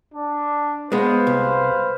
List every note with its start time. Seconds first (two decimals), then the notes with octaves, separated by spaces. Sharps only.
0.15 D4
0.92 G#3 B3 B4 C5 F5
1.27 C2